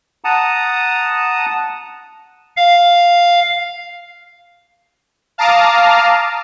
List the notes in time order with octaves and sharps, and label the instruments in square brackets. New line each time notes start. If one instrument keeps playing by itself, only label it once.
[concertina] F#5 A5 A#5 D#6
[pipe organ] F5
[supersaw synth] F5 A5 A#5 D6 D#6 F6